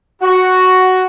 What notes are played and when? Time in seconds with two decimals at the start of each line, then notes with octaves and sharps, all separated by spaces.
0.21 F#4